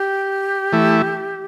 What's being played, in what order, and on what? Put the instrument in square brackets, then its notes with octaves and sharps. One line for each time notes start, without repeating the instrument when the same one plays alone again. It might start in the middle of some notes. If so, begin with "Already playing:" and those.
Already playing: [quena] G4
[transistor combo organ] E3 A3 E4